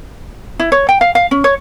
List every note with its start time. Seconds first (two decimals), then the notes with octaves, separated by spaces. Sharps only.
0.60 E4
0.72 C#5
0.89 G5
1.01 F5
1.15 F5
1.31 C#4
1.44 C#5